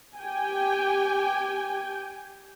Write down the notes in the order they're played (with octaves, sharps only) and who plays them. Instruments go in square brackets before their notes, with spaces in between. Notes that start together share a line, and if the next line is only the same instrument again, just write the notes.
[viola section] G4 G5 G#5